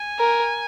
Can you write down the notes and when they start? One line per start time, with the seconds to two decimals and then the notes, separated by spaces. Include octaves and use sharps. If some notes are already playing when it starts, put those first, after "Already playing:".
Already playing: G#5
0.19 A#4